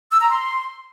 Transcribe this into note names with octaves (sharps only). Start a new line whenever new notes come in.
E6
A#5
C6